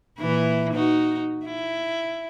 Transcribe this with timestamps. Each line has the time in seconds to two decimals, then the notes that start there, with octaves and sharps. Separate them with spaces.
0.19 A#2 E3 E4
0.73 D#4 F#4
1.46 E4